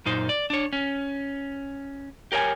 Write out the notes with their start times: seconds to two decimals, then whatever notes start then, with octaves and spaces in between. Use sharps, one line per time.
0.06 F#2 A#2 D#4 C5
0.29 D5
0.50 D4 C#5
0.73 C#4
2.32 G4 A#4 C#5 E5 G#5